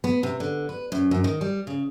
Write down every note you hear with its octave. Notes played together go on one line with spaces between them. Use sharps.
B3
C3
D3
B4
F#2
F#2
D#3
G3
C#3